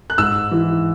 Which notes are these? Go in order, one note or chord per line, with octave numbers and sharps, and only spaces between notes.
F#6
G#2 E6
E3